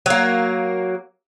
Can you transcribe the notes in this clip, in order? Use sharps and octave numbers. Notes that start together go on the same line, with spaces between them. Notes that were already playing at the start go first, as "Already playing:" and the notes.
F#3 A#3